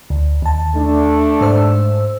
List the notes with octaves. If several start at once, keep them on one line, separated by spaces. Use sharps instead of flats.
D2
D#2 A5
A3 D4
G#2 C5 E6